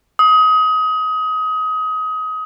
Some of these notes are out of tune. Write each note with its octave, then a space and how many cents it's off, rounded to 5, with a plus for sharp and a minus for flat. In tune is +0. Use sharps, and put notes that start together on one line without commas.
D#6 +25